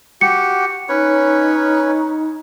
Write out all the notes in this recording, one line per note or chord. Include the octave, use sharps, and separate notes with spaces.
F#4 G4 C#7
C#4 D#4 B4 C#5